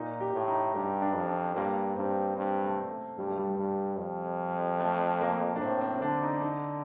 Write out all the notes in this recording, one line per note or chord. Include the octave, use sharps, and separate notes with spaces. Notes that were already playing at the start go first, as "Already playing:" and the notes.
Already playing: A#2 D#4
G4
A2
D#4
G2 G4
D4
F2
C4
G2 A#3
G2 C4
G2 C4
A3
A3
G2 G3
A3
G3
G2
F2
A3
A#3
D4
A2 C4
C4
C4
D3 D4
D#4
D#4